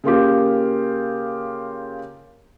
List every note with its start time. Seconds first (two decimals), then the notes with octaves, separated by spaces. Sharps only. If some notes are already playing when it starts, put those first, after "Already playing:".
0.04 C#3 A#3 F4 G4